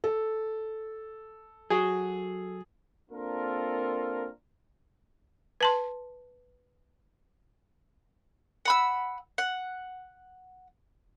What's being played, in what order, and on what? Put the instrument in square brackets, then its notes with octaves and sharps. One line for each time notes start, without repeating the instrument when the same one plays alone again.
[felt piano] A4
[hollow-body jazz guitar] F#3 F#4 [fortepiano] G#4
[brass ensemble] A#3 C4 D4 F4 A4 A#4
[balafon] B4 A5 C6
[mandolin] F#5 B5 E6
F#5